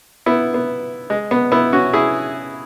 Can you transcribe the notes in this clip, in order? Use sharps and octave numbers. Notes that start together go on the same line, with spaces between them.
B3 E4
B3
G#3
B3
B3 E4
C#4 F#4
E4 G#4